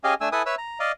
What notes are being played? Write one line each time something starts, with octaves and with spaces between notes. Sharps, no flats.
C#4 G4 G#4 D#5 F5 G#5
A3 D4 G#5 E6
E4 A4 B4 G#5 D#6
B4 C#5 E5 E6
A#5
D5 D#5 F5